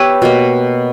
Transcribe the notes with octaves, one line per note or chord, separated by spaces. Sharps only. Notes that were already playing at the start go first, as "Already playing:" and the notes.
Already playing: B3 G4 B4 C#5 E5
B2 A#3